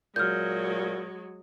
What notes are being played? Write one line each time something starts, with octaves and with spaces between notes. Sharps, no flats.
A#2 F#3 G#3 F6 G6